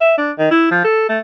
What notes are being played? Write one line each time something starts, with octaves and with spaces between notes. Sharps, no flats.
E5
D4
D#3
E4
F3
A4
A3